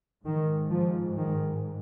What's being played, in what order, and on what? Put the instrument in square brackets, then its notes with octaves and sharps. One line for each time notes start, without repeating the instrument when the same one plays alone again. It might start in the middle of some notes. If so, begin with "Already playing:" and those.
[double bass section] G#2 D#3
F3
D#3